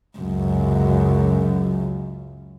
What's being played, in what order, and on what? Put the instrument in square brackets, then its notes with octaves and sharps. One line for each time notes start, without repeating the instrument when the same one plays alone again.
[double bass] C#2 F#2